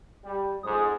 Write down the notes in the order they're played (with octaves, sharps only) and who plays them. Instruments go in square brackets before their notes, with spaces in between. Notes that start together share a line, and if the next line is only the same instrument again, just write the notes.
[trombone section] G3
[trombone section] F2 G#2 [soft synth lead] D#6